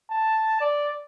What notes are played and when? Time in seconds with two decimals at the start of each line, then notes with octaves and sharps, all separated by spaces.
0.10 A5
0.61 D5